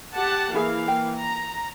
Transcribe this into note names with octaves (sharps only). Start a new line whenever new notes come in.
G4 F#5 A5
E3 A#3 E4 G#4 F5
G5
A#5